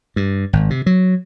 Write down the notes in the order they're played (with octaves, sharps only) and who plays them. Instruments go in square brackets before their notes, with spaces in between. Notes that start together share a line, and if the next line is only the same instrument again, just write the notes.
[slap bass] G2
G#1
C3
F#3